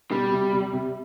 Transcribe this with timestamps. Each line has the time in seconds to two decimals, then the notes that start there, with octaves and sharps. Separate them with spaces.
0.12 B2 G3
0.32 C3
0.53 C3
0.73 C3